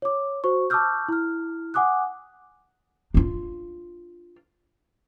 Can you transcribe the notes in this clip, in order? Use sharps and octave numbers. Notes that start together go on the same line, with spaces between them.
C#5 D6
F#4 C5 C#6
A5 C#6 D6 E6 F6 G6
E4 F6
F#5 G#5 D6 D#6 F#6
D4 F4